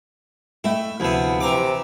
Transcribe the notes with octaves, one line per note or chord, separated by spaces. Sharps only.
A3 E4 D#5 G5
D2 C3 F3 B3 E4
C3 E3 A#5 D6